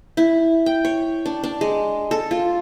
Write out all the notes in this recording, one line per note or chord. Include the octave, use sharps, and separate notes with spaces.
E4
G5
C#5
D4
D4
G#3
A4
F4